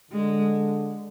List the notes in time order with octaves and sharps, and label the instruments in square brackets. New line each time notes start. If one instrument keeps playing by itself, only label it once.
[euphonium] D3 [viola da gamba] G#3